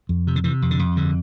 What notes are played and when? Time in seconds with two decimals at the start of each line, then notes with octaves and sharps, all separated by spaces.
0.09 F2
0.27 C3
0.36 D3
0.44 C3 E3
0.62 F2
0.71 D3
0.79 F2
0.96 G2 D3